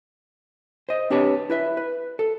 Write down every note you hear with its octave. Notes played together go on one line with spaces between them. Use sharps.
C5 D#5
C4 D4 G4 B4 C#5 A5
E4 B4 E5
B4
A4